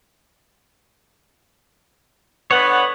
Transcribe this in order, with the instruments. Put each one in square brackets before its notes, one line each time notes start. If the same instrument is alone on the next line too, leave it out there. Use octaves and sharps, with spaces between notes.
[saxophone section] D3 B3 [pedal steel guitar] C#5 F#5